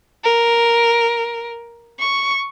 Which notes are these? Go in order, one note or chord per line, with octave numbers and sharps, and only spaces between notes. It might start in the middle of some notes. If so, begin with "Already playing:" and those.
A#4
C#6